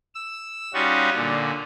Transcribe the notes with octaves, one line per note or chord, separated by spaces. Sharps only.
E6
G3 C#4 D#4 F4 F#4
A#2 D3